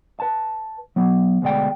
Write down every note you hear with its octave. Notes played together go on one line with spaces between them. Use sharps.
B4 A5
F#3 B3
D2 B2 G#3 D5 G5